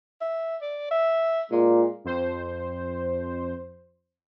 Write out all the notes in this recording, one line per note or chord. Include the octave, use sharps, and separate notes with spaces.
E5
D5
E5
A#2 G#3
F2 C5